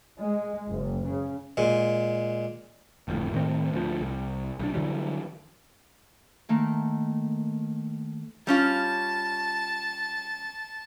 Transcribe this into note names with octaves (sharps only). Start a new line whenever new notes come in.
G#3
F#1
C#3
A#2 G#3
G1 F2 A2
A2 D#3 C4
D2 F3
C2
B1 D4
D3 E3 F#3 G3
D#3 A3 A#3
G3 C#4 F4 A5